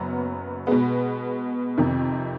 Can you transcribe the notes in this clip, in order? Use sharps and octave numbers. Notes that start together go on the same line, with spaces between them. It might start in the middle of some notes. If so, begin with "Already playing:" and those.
Already playing: F#1 F#2 F#3 B3
B2 G#3 B3
F2 C3 D#3